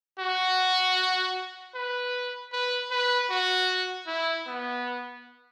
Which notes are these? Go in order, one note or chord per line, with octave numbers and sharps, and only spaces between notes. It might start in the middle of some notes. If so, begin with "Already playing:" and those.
F#4
B4
B4
B4
F#4
E4
B3